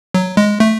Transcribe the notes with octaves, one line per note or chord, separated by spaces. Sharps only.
F#3
G#3
A3